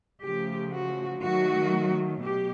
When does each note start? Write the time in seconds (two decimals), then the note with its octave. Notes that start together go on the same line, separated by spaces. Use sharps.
0.23 C#3 F3 A3 G4
0.73 F#4
1.22 D#3 F#3 A3 F#4
2.22 B2 G4